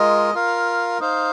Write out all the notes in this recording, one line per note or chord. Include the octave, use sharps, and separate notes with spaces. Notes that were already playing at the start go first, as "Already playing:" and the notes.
Already playing: G#3 F4 A#4 D#5
F4 A#4 F5
D#4 C5 F5